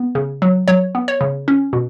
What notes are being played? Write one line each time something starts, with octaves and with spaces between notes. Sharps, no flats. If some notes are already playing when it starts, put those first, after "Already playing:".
Already playing: B3
C#3
F#3
F#3 C#5
B3
C#5
C#3
C#4
B2